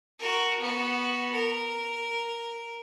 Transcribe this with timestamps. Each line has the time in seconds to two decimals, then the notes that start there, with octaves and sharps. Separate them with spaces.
0.19 F#4 A#4
0.60 B3 F#4
1.32 A#4